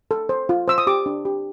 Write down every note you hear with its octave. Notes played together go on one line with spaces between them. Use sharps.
A4
C5
F4
C5 E6
D#6
G4 D6
D4
G4